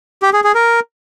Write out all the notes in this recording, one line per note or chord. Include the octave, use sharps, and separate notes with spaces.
G4
G#4
G#4
A#4